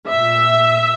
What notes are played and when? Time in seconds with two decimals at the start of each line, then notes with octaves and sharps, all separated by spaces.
0.09 A#2 E5